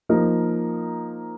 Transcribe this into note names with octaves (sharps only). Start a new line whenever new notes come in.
F3 A#3 D#4 A#4